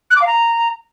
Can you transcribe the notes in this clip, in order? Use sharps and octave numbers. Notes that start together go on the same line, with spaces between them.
F#6
D6
F5
A#5